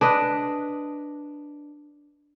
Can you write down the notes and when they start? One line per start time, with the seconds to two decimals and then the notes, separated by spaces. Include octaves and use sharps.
0.01 D4 B4 D#5